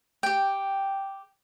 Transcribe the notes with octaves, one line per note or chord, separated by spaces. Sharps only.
G4 G5